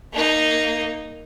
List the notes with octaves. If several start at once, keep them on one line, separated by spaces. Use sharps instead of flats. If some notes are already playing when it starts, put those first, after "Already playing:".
A#3 D#4